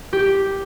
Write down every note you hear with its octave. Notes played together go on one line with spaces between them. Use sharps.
G4